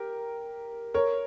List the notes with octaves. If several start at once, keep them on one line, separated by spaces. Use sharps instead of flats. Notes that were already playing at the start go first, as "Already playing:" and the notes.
Already playing: G4 A#4
A#4 C#5